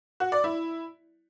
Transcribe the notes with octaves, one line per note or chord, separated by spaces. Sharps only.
F#4
D5
E4